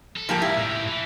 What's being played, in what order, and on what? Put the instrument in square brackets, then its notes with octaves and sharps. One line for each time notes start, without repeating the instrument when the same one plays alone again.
[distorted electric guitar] A4
[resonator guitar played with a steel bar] F3 A#3 G4 [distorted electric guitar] G3 G#3
[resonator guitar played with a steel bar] E4
[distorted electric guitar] A2 G4
E3